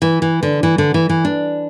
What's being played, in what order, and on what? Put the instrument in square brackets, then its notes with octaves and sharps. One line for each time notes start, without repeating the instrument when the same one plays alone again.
[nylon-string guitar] E3
E3
D3
E3
D3
E3
E3
D4